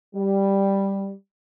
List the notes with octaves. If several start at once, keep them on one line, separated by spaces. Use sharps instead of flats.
G3